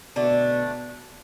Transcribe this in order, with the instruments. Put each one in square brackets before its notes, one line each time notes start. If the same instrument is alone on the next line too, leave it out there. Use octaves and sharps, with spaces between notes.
[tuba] B2 [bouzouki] D3 A3 D4